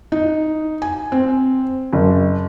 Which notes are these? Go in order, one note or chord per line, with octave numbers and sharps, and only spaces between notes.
D#4
G#5
C4
F#1